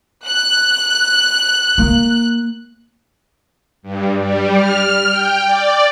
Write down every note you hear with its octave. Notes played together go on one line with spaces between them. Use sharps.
F#6
A#3
G2
G3
F6
G5
D5